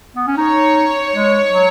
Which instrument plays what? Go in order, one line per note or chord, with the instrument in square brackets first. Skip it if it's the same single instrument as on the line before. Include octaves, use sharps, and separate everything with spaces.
[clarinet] B3
C#4
[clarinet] D#4 [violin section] C#5
[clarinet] G#3
F#3